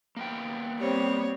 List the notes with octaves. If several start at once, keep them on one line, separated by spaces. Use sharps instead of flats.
A#3 B3 G5
G3 C4 C#5